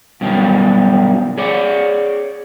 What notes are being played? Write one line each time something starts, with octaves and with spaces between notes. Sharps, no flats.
G2 B2 D#3 E3 F#3 G3
G#4 C#5 D5